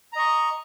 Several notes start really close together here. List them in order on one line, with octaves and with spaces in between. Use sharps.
A#5 D#5 C#6